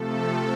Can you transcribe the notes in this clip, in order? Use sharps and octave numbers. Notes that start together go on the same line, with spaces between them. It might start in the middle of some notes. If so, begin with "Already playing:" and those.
Already playing: C3 F3 A3 A4